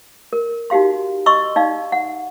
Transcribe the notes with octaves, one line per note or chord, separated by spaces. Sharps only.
A#4
D#4 F#4 G4 F5 C6
D#5 C6 C#6 E6
D#4 D5 F5
F#5